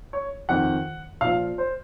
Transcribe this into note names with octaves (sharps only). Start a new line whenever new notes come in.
C#5
F2 D#3 F#5
A#2 F3 F5
C5